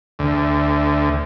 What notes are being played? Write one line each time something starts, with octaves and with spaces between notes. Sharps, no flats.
D2